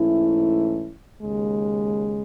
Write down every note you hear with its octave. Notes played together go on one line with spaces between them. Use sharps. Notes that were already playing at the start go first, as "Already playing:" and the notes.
Already playing: G#2 E3 A3 C#4 E4
D#2 C#3 G#3